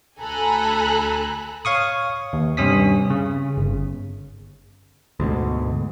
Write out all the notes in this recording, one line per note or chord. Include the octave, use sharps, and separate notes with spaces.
D2 A4 G#5 A#5 B5 F#6
C#5 F5 C#6 D#6
D#2
G2 C3 C#4 D#6 B6
C#3
G1
D2 G#2 B2